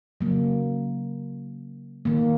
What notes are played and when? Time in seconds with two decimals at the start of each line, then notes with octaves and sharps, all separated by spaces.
0.21 C#3 F#3 A#3
2.05 D#3 A#3